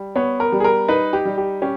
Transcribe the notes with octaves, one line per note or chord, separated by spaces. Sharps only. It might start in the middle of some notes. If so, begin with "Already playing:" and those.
Already playing: G3
B3 C#5
A#4
G3
G#4
A#4
D#4 B4
G4
G3
G4
C#4 G4